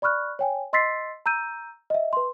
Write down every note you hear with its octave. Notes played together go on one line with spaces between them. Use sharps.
D5 B5 C#6 F6 F#6
C#5 G5 G#5
D#5 C6 E6 A6 B6 C7
A#5 E6 G6 D#7
D#5 E5
B4 C6